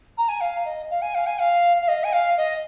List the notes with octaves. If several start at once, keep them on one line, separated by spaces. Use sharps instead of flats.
A#5
G#5
F5
D#5
F5
G#5
F5
G#5
F5
F5
D#5
G#5
F5
D#5